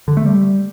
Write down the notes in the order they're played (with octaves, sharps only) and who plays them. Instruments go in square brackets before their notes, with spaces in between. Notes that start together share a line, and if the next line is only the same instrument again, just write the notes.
[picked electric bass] D3
A3
G3